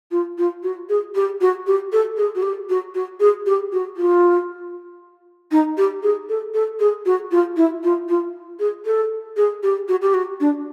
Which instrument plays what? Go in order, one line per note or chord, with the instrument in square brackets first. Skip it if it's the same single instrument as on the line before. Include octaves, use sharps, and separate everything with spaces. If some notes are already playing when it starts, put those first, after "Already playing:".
[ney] F4
F4
F#4
G#4
G4
F#4
G4
A4
G#4
F#4
G4
F#4
F#4
G#4
G4
F#4
F4
D#4
G4
G#4
A4
A4
G#4
F#4
F4
E4
F4
F4
G#4
A4
G#4
G4
F#4
G4
F#4
D4